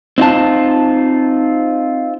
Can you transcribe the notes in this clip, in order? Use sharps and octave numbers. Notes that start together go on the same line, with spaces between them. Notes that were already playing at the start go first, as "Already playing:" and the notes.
C4 D#4 F4 A5